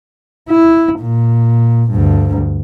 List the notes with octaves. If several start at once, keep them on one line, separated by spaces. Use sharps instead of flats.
E4
A#2
D2 G2